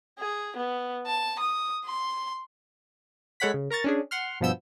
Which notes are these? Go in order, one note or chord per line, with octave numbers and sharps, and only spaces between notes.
G#4
B3
A5
D#6
C6
G#3 A4 C#5 F#5 B5 B6
C#3
A#4 A#5 C#6 A6
C#4 D4 G#4
F#5 C6 F6
G2 B2 F3 B3 E6 G6